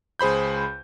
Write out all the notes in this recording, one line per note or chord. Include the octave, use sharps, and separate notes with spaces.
C#2 G#4 C5 B5 G6